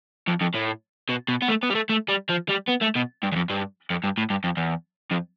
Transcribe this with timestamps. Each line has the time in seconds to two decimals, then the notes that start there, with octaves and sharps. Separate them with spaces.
0.28 F2
0.41 F2
0.55 A2
1.09 B2
1.28 B2
1.42 B3
1.48 A3
1.63 B3
1.70 G3
1.75 A3
1.89 A3
2.09 G3
2.30 F3
2.50 G3
2.69 B3
2.82 A3
2.96 B2
3.23 G2
3.32 E2
3.36 F2
3.50 G2
3.90 F2
4.04 G2
4.17 A2
4.30 G2
4.44 F2
4.57 E2
5.11 F2